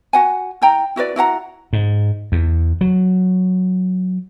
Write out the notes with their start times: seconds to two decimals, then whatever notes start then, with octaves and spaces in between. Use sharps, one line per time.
0.13 F#4 F#5 G#5
0.62 E4 G5 A#5
0.96 E4 F#4 B4 D5
1.16 E4 F#4 F#5 A#5
1.73 G#2
2.32 E2
2.81 F#3